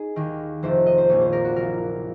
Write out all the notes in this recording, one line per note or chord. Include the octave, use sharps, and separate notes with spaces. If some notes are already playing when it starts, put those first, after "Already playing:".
Already playing: D#4 G#4
D#2 D#3
F1 F2 C3 D#3 C5
D#5
C5
A#1 A#2 F3 C#5
C5
A#4
F#4
F#1 F2 C#3 F3 A#4